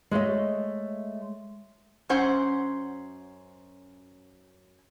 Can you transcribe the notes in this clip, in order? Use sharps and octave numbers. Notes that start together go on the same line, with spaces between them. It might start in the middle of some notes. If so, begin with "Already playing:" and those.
G#3 A3 C#5 D#5
F#2 C#4 C5 F#5